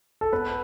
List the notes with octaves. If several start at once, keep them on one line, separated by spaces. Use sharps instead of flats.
A4
B3 B4